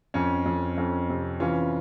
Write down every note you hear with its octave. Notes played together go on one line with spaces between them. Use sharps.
F2 C#4
F2
F2 C#4
C3
E3 C#4 F4